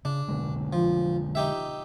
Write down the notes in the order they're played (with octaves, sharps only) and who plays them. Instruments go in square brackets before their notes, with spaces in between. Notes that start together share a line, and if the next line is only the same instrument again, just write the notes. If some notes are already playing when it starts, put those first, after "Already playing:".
[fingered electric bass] C#3 [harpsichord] D4
[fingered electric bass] B2 D3 G#3
[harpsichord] F3
D#4 G4 E5